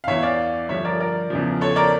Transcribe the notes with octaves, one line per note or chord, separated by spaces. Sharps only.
F5
E2 E3 C#5 E5
D5 F5
G2 D3 F3 C#5 E5
A#4 D5
A#4 D5
E2 C#3 F3
A4 C#5
A#4 D5